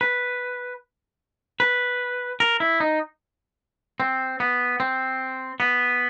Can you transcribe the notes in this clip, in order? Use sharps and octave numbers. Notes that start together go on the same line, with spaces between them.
B4
B4
A#4
E4
D#4
C4
B3
C4
B3